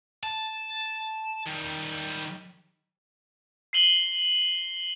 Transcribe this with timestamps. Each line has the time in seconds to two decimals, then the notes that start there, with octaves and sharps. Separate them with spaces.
0.23 A5
1.46 D#3 G3
3.73 C7 D#7 F#7 G7